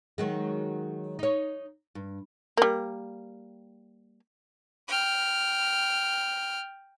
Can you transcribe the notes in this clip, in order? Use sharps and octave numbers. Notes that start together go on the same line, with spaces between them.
D#3 F#3 G#3
D#4 C#5
G2
G3 A#3
G5 F6